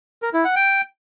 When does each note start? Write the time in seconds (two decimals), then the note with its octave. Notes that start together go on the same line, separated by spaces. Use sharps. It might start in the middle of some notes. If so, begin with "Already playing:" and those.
0.22 A#4
0.33 E4
0.45 F#5
0.56 G5